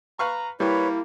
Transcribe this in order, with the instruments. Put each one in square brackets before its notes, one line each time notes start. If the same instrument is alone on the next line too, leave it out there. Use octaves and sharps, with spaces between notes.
[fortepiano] B4 F5 C#6 [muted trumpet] A#5
[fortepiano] G3 [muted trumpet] A#3 [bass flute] E4 [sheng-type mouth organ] B4 C#5